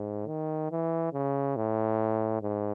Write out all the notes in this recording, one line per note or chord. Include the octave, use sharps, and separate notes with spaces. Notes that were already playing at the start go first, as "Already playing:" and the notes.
Already playing: G#2
D#3
E3
C#3
A2
G#2